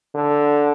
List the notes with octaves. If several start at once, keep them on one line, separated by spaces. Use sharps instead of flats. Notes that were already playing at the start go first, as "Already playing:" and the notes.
D3